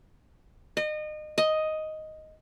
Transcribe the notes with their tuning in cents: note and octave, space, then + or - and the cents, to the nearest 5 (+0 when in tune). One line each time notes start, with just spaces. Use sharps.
D#5 -30
D#5 +5